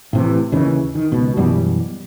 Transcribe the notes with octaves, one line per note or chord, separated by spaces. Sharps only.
A2 C3 E3
D#2 C#3 E3
D#3
C#2 B2
F#2 B2 E3 G3